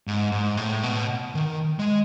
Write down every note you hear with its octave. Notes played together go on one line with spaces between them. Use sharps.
G#2
G#2
A2
B2
D#3
G#3